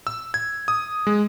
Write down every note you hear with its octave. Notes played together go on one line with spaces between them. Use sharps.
E6
G#6
D#6
G#3